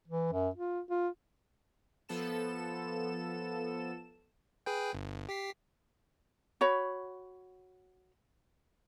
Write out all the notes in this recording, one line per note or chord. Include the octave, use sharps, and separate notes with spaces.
E3
F#2
F4
F4
F3 B3 A4 E7
G#4 B4 G5
G1
G4 B6 C7
F#4 C#5 B5